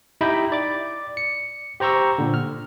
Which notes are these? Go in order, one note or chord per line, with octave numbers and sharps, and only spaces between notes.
D#4 E4 G4 D#5 G5 B5
D5 D6
C#7
G4 C5 A#5 C#6 E6
A#2 D3
F6